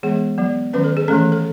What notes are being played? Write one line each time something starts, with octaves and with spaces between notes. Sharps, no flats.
E3 G#3 B3 G#4
F#3 B3
D#3 F#3 C#4 B4
A4
G#4
E3 A3 C#4 A4
A4